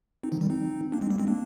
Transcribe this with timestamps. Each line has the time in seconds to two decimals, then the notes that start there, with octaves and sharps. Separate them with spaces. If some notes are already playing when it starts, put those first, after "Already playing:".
0.23 C4 D#4
0.32 D3 F3
0.41 D#3 G3
0.50 C4 D#4
0.92 A#3 D4
1.01 G#3 C4
1.10 G3 A#3
1.18 G#3 C4
1.27 A#3 D4